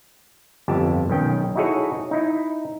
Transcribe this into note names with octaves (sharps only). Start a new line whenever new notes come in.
G1 F2 G4 A5
B1 D#3 C#4 G5
D#4 E4 F#4 G#4 A4 C#5
D#4 E4